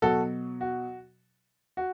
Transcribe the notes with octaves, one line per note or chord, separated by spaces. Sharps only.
B2 F#3 F#4 A4
F#4
F#4